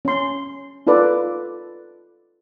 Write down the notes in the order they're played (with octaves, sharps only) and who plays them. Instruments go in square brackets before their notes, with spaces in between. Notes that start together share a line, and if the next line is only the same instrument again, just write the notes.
[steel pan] C#4 C6
D#4 F4 A4 B4 D5